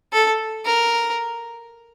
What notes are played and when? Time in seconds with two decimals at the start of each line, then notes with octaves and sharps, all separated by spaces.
0.13 A4
0.65 A#4